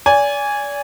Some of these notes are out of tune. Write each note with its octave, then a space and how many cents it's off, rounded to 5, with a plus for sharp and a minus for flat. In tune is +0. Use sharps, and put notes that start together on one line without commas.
D5 -35 G#5 -10